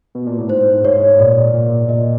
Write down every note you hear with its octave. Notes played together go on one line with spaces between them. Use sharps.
B2
A#2
A2
G#2 C5
G#2 C#5
A#2 D5
A#2
A#2 D#5